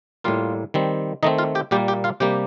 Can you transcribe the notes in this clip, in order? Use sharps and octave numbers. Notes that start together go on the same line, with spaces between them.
A2 G3 A#3 F4 F5
D#3 G3 C4
D#3 A3 C4 D#4 D#5
F4 F5
G4 G5
A#2 G3 A#3 G4 G5
G4 G5
F4 F5
C3 G3 A#3 G4 G5